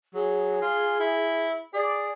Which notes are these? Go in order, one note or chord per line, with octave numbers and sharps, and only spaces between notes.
F#3 G#4
F4
E4
G#4 D5